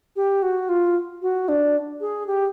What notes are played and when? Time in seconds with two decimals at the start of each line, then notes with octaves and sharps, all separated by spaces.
0.16 G4
0.42 F#4
0.69 F4
1.22 F#4
1.48 D4
2.01 G#4
2.27 G4